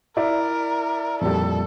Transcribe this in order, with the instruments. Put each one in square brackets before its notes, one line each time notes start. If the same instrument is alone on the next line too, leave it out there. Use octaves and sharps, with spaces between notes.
[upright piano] E4 D5 E5 [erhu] A#4
[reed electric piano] F2 A#2 G3 [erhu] A4